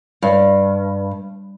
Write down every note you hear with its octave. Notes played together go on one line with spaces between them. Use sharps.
G2